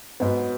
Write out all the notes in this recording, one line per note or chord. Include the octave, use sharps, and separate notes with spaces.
G#2 F#3 B3